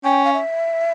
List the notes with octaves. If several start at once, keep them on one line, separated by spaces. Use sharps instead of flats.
C#4 G5
F5
E5